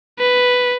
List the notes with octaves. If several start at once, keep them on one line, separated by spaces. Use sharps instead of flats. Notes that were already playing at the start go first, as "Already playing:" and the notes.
B4